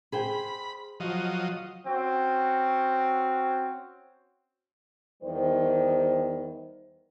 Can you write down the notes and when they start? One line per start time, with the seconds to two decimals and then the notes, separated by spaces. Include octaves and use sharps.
0.12 G#4 C5 G5 B5
1.00 F3 F#3 D#5
1.87 C4 C#4 F#4
5.22 E2 D#3 G3 C5